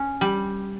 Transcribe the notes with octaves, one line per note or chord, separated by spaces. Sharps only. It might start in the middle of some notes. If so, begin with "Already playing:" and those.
Already playing: C#4
G3